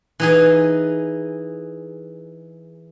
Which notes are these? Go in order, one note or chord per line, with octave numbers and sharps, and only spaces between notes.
E3 D#4 G#4